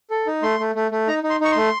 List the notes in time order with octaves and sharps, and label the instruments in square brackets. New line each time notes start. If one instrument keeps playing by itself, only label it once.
[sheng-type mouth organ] A4
D#4
A3 C6
A3
A3
A3
D#4 A#5
D#4
C6
D#4 C#6
A3 C6